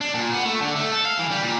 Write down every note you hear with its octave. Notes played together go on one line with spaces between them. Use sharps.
D4
A#2
B3
A3
D3
A3
A4
F5
E3
G3
A#2